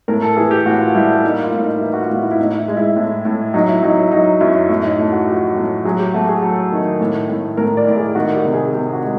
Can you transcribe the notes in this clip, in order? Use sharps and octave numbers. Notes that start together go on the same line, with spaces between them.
A2 A#4
A4
E3 G#4
G4
A2 F#4
F4
G3 E4
A4
A#3 D#4
F4
A2
D#4
D#4
E3 E4
F#4
F4
A2
E4
E4
A2 D#4
E4
G#3
E4
A2
A2
F#3 D#4
E4
F#3 D#4
E4
F#3 D#4
F#2 E4
A2 E4
D#4
A3 E4
F#4
F3 G4
A2
F#3 G#4
G4
A3 F#4
G#4
F#3 A4
D#3
A2
A2
A2 A#4
D5
A2
G#4
D#3 F#4
G4
C3
G#4
C3 G4
F#4
G#3